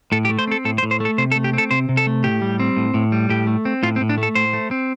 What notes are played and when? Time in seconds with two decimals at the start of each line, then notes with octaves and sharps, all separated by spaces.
0.12 A2 A4
0.25 G4
0.30 A3
0.39 C5
0.47 C4 A4
0.65 A2 A4
0.78 C5
0.83 A2
0.91 C5
1.00 A3 A4
1.18 C3 C5
1.32 A4
1.36 A3
1.44 G4
1.53 C4 A4
1.71 C3 C5
1.89 C3
1.97 A4
2.07 A3
2.24 A2 G4
2.42 G3
2.60 C4
2.77 A2
2.94 A2
3.12 G3
3.30 A2 G4
3.47 A3
3.65 C4
3.83 A2 F4
3.96 C4
4.01 A2
4.09 D4
4.18 A3
4.23 A4
4.35 A2 C5
4.53 A3
4.71 C4